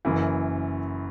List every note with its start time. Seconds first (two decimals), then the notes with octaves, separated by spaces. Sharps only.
0.05 F#1 F#2 E3